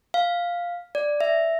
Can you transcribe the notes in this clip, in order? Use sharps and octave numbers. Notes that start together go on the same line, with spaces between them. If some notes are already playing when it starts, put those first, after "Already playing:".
F5
D5
E5